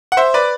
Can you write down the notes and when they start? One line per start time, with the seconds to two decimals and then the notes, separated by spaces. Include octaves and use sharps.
0.12 F#5
0.17 C5 E5
0.34 B4 D5